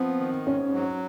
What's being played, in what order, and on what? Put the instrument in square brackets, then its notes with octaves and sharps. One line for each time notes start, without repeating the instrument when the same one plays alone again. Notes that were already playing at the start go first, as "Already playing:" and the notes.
Already playing: [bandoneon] F3 B3 [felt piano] C4
[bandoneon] D#3
[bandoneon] G#2 [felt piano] C#4
[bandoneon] F#3